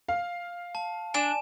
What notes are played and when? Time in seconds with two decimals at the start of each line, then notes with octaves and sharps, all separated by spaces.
0.08 F5
0.75 A5
1.14 D4 G#5 E7